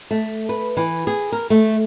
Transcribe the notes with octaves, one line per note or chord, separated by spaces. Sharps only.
A3
B4
E3
G#4
A#4
A3